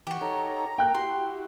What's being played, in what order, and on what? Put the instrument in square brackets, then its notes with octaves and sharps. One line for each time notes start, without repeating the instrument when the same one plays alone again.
[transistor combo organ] E3 [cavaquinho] F#4 G4
[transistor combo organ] D#4 A4 C#5 [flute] A#5
[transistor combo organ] A#3 [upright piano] G5 F#6
[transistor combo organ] E4 F#4 G4 [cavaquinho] C6